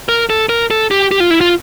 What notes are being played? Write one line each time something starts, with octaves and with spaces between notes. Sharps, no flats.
A#4
A4
A#4
A4
G4
G4
F4
E4
F4